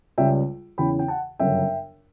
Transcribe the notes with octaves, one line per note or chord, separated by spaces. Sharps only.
C#2 C#3 G3 E5 G5
E2 C#3 E3 G5 B5
G5
F#5 A5
G1 F#2 C#3 F#3 E5 G5